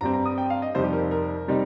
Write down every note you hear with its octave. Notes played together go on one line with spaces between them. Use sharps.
G2 G3 C4 A#5
A#5
D#6
G5
F5
D#5
F2 C3 G3 D#4 C5
G4
A#4
A#4
C3 G3 C4 D#4